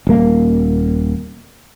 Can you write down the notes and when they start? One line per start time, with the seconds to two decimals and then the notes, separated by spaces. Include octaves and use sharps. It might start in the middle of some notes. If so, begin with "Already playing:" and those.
0.07 D#1 A#3